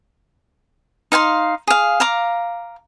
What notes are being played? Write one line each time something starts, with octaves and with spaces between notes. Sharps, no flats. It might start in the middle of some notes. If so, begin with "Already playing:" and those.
D#4 F5 G#5 C6
G#4 F5
F5 A#5 D6